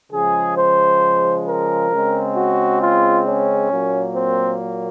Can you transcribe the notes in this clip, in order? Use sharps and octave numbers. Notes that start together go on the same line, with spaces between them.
C#3 F3 G#3 G#4
C5
A#4
C#3 G#3 C4
F#4
F4
C#4
A#2 F#3 A#3
C4